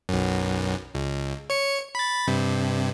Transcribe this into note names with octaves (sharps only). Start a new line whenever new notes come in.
B1 F#2
C#2
C#5 C#7
B5 A6
G2 C3